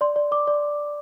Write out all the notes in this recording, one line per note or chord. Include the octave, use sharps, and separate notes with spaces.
D5 C6
D5
D5 D6
D5